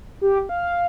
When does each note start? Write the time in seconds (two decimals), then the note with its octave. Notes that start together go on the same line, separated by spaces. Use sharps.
0.21 G4
0.49 F5